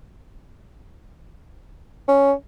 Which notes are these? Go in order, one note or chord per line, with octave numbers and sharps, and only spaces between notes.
C#4